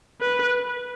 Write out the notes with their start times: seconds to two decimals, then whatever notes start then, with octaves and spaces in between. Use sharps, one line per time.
0.21 B4